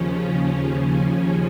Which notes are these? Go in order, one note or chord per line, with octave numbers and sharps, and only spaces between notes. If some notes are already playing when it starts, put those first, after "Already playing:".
Already playing: D#2 C#3 F3 C#4
C#4